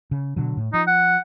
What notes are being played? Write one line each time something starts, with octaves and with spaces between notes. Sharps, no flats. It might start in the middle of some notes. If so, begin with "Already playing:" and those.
C#3
B2 D3 F#3
A2
F3 D#4
F#5